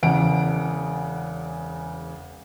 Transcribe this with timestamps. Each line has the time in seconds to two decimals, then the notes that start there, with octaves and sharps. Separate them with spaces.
0.03 E1 E2 C#3 F#5 D7